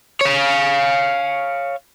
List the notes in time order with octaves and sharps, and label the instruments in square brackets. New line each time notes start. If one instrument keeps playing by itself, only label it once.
[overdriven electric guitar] C#5 F5